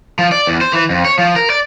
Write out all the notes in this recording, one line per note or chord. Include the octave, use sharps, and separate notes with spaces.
F3
D5
E2
C5
E3
F2
C#5
F3
A#4
D5